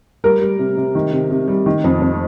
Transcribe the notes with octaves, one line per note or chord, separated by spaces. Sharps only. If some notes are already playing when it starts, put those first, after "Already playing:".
G3 A#4
G3
C3
C3
D#3
C3
C3
G3
D#3
F2
F2